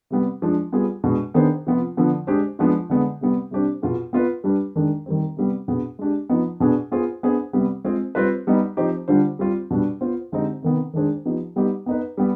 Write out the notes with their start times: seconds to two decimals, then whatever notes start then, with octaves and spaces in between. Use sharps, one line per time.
0.10 C3 G3 B3
0.42 F3 G#3 D4
0.72 G3 B3 F4 G#4
1.04 B2 G#3 D4
1.34 D#3 B3 D4 G#4 C5
1.66 C3 F3 B3 F4
1.97 D3 F3 B3
2.27 G#3 D4 G4 C5
2.59 F3 G#3 B3 D4 F4
2.90 D3 G#3 B3
3.21 C3 G3 B3
3.51 C3 G3 D4 G4 C5
3.82 B2 B3 F4 G#4
4.13 B3 F4 B4
4.44 G3 D4 G4 B4
4.76 D#3 G#3 D4
5.06 D#3 G3 C4
5.37 C3 G3 B3
5.68 B2 B3 D4 G#4
5.99 G#3 D4 G4
6.29 F3 B3 D#4
6.60 B2 B3 D4 G#4
6.92 B3 F4 G#4 C5
7.23 B3 D4 G#4 C5
7.53 C3 G3 B3
7.85 G#3 C4 F4 G#4
8.15 G3 C4 F4 B4
8.47 G3 B3 D#4
8.77 F3 C4 D#4 G4 C5
9.08 D3 G3 D4 F4 C5
9.39 G3 C4 F4
9.70 B2 G3 D4
10.01 B3 F4 C5
10.32 D3 G#3 C4 D#4 G4
10.62 C3 D#3 B3
10.94 D#3 G#3 D4 G#4 C5
11.25 F3 B3 D#4 G4
11.56 G3 B3 D#4 G4
11.86 B3 D#4 B4
12.17 G3 B3